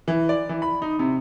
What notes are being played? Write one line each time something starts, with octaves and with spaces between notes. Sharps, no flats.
E3
D5
E3
B5
D#4
C3